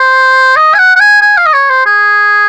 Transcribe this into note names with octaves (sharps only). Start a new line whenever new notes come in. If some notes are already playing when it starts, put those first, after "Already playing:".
Already playing: C5
D#5
G#5
F#5
F#5
G#5
G#5
F5
D#5
C#5
C5
G#4